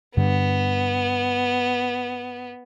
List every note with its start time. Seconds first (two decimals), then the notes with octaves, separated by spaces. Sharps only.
0.17 G2 D3 B3